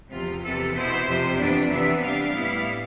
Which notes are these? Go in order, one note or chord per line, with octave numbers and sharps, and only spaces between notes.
E2 C3 F3 F4
E2 C3 E3 A4
B2 B3 E4 C5
F2 C3 F3
F2 C3 E3 B3 D4
C3 E3 B3 D4 E5
C3 G3 D4 F5
A2 G3 B3 E4